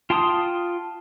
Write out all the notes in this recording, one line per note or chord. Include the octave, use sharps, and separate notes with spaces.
F4 G5 A5 C6 D#6